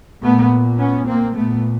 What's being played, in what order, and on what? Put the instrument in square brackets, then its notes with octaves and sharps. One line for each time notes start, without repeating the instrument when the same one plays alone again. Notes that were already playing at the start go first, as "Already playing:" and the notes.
[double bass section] A#2 A3 B3
B3 C#4
A#3 C4
A#2 A3 B3